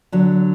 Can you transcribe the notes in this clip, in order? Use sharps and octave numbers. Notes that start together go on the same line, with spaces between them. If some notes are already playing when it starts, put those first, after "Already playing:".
D3 F#3